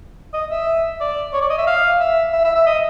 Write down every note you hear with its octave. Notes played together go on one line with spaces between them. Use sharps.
D#5
E5
D5
C#5
D5
D#5
E5
F5
E5
E5
E5
E5
D#5